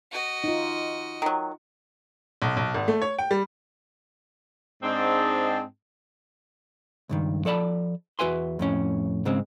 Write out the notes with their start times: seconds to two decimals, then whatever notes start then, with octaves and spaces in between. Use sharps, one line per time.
0.11 F#4 D#5
0.44 D#4 F4
1.22 D#3 F#3
2.42 B1
2.57 B1
2.74 G#1
2.88 A3
3.02 C#5
3.19 G5
3.31 G3
4.83 G#2 C4 D4 D#5 A5
7.09 C#2 G2 D#3
7.45 F3 A4 D5 A5 B5
8.19 E2 F#4 B4 E5 G#5 C6
8.59 F2 A2 C#4
9.25 G#2 C#3 G#3 C4